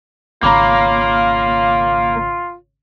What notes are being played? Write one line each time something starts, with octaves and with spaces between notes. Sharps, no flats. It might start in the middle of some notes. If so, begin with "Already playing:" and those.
G#1 C#3 A#3 F4 C#5 A#5 B5 D6